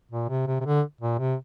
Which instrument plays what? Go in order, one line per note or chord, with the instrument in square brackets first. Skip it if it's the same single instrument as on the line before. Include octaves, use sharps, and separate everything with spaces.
[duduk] A#2
C3
C3
C3
D3
A#2
C3